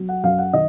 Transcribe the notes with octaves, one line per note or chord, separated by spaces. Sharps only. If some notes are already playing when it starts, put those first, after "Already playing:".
Already playing: F#3
F#5
F#2 F5
F#5
D#3 D#5